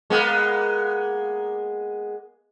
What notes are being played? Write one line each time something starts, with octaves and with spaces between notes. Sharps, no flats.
G#3 A#3 B3